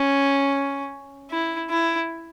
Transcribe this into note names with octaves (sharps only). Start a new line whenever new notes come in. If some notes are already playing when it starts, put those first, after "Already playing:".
Already playing: C#4
E4
E4